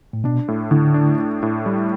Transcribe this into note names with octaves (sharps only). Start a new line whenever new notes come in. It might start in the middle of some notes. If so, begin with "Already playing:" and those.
A2
B2 D4
A2
A2 D3
D4
D4
A2
G3